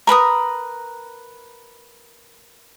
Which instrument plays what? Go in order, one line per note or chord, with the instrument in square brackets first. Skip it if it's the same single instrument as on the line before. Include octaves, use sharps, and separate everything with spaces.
[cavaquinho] A#4 B4 A#5 D#6